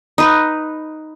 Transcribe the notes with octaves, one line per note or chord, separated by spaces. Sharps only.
D#4 B4